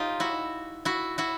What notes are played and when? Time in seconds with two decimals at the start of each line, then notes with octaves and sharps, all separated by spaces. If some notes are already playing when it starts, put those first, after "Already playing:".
Already playing: D#4 F4 G4
0.20 E4 F#4
0.85 E4 F#4
1.18 E4 F#4